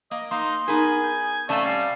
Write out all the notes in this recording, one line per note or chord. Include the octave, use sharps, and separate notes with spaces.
A#3 D#5
A#3 D#4 C6
B3 D#4 G#4 A#4 G#5 B5
G6
C3 A3 C#4 D5 F5 A5
G3 A6 C7